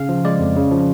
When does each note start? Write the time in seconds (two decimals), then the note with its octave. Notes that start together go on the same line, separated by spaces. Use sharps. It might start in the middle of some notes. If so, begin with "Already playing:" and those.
Already playing: C#3 F5
0.09 F3
0.25 G#3 D5
0.40 F2
0.56 C#3
0.72 F3